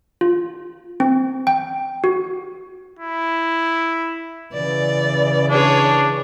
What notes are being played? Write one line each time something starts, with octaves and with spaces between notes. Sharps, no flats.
F4
C4
G5
F#4
E4
C#3 E3 D5
D4 G#4 C#5